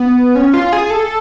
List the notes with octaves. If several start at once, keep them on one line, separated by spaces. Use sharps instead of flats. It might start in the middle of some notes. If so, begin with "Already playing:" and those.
Already playing: B3
C#4
F4
G#4
A4